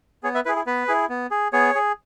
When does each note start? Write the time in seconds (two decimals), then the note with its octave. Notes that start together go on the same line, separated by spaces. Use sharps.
0.23 B3 G#4 C#5
0.35 B4 E5
0.45 E4 G#4 B4
0.56 G#4
0.66 B3 B4
0.88 E4 G#4
1.09 B3
1.31 G#4
1.53 B3 G#4 C#5
1.75 G#4